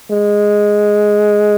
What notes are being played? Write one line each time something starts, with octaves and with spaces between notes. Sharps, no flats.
G#3